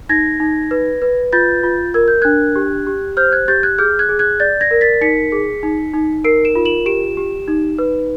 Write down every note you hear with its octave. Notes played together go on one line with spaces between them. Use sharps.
D#4 G#6 A#6
D#4
B4
B4
F4 G6 A6
F4
A#4 G#6
G6
D4 F#6 G#6
G4
G4
C5 F6 G6
F#6 G#6
G4 G6 A6
F#6 G#6
G#4 F6 G6
F#6 G#6
G#4
F#6 G#6
D5 G6 A6
G#6 A#6
A#4
A6 B6
D#4 B6 C#7
G#4
D#4
D#4
A#4 C7 D7
D7 E7
F4
E7 F#7
G4 D7 E7
G4
D#4
B4